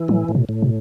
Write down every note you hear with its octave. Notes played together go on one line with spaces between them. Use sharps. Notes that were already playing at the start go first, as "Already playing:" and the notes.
Already playing: E3
A2 F#3
A2
B2
A2
B2